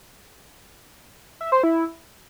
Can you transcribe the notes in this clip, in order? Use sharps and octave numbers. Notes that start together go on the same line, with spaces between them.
E5
C5
E4